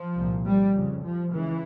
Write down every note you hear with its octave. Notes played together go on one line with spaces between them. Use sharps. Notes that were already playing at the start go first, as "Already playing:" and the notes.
Already playing: F3
C2 A#2
G3
F2 C#3
F3
C#2 C#3 E3